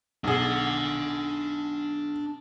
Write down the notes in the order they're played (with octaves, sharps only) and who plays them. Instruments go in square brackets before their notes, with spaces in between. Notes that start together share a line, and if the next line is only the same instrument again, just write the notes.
[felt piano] B1 G#4 [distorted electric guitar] D4 F#5